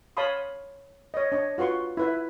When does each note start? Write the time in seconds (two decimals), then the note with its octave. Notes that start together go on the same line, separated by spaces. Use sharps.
0.17 C#5 F5 A5 B5 C6 D#6
1.14 C#5 D#5
1.32 D4 C#5 D#5
1.58 F4 F#4 B4 C6 C#6
1.97 E4 B4 E5